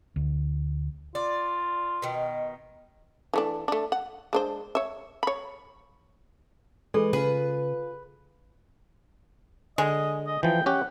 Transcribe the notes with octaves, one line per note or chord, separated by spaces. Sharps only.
D2
F4 D5
B2 D#3
E3 A3 D4
A3 D4
F#5
G#3 D4 C5
C#5 E5
C#5 B5
E3 G#3 A4
C#3 F4 G#4 B4
D3 G#3 D#5
D#5
E3 F3 G5
C#4 G4 F#5